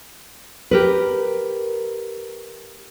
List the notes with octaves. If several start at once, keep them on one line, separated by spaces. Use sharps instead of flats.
G4 A#4 B4